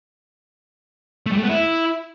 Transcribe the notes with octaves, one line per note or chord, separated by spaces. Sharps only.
A3
G3
A3
B3
E4